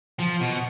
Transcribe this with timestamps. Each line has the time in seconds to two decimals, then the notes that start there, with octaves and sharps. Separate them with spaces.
0.20 F3
0.41 B2